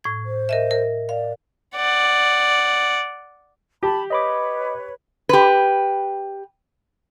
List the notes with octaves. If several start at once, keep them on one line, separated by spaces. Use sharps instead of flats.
A2 G#6
C5
A#4 D#5 E5
A#4
D5 F5
D5 F#5
G4 A5 B5
B4 C#5 D#5 B5 D6
G4 B4